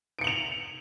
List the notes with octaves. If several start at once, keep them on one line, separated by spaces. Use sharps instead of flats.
C#7 D7 F7 F#7